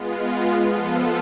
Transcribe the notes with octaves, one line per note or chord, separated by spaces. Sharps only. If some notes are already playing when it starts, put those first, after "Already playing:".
Already playing: G#3 B3 F4
F3 B3 F4 A4